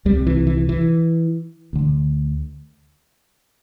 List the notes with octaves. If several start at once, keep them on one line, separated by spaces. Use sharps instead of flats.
C2 C3 G3
E3
E3
E3
D2 D3